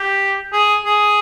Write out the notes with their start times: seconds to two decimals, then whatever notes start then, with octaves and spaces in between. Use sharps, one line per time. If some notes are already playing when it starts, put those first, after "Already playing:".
Already playing: G4
0.53 G#4
0.85 G#4